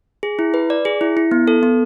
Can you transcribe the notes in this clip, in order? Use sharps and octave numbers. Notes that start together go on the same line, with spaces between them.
G#4
E4
B4
D5
G#4
E4
E4
B3
A4
B3